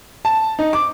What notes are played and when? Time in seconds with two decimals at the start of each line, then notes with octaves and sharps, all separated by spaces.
0.25 A5
0.59 D#4
0.73 D6